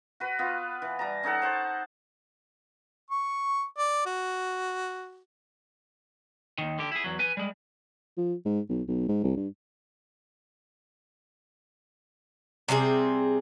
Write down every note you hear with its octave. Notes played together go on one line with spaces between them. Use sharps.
F#4 B4
B3 F4
E3
G3 A5 A#5
C#4 D#4 A4 F#5
C5 F#5 A5
C#6
D5
F#4
D#2 D#3
D3 G4
E4 G#4
E2 F#3
B4 G#5
G3 G#3
F3
G#2
B1
B1
G#2
C2
G2
C3 G3 C4 G#4